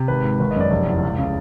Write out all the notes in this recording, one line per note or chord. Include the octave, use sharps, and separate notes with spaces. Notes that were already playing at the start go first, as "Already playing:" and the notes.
Already playing: C3
G#1 B4
G#2
G#1 B4
D#5
F#2 D5
F1
E2
C#2
C#3